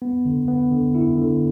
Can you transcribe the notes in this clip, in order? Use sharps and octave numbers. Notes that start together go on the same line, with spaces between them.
B3
D3
B3
D3
E4
D3